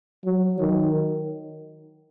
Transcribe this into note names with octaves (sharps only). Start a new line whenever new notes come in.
F#3
D#3